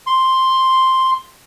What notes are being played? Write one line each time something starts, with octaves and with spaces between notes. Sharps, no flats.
C6